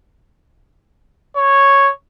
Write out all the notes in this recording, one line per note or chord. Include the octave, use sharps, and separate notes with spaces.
C#5